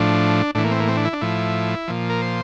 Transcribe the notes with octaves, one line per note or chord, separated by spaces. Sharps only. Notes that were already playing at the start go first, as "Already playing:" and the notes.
Already playing: A2 F3 D4
A2 E3 D4
A#3
C4
A#3
C4
D4
E4
D4
A2 F3 E4
A#2 F3
A#4
C5